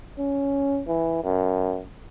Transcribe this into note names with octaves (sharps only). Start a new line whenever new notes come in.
C#4
E3
F#2